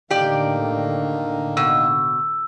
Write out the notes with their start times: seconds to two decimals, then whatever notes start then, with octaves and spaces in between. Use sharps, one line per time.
0.10 A2 D3 D#3 A#3 G4 D5
1.57 B2 E6